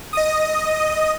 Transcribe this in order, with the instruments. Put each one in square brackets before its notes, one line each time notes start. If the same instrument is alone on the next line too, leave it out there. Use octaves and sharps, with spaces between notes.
[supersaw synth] D#5 D#6